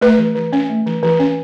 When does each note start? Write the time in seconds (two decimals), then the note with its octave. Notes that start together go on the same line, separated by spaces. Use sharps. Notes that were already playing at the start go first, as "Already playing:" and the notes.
0.01 A3 B4
0.18 E3
0.35 E3
0.53 C#4
0.69 A3
0.86 E3
1.03 E3
1.20 C#4